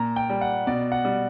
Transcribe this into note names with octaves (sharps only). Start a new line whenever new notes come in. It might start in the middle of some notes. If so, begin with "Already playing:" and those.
Already playing: A#2 A#5
G5
G3
F#5
B2 D5
F#5
G3